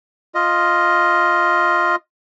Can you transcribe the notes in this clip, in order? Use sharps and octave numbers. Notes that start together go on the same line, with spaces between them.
F4 D#5